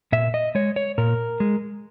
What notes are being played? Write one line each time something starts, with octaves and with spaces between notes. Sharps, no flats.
A#2 E5
D#5
G#3 C#5
C#5
A#2 A#4
G#3